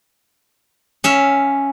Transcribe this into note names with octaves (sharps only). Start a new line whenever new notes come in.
C#4 E5 F5